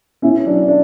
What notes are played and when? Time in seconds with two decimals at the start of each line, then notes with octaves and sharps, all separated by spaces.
0.22 B2 C#4 E4
0.46 F#3 D4
0.68 D4